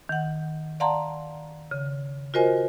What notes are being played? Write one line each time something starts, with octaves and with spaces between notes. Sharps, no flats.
D#3 F#5
D5 F5 F#5 A5 A#5 C6
C#3
F4 F#4 A#4 C5 D#5 G#5